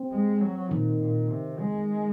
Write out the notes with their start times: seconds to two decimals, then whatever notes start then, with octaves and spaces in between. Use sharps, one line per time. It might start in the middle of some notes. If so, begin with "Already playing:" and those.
Already playing: C4
0.12 G#3
0.41 F#3
0.70 A#2 D#3
1.00 A#2
1.30 C3
1.60 G#3